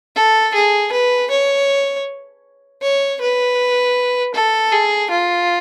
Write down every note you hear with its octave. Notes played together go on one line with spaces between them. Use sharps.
A4
G#4
B4
C#5
C#5
B4
A4
G#4
F4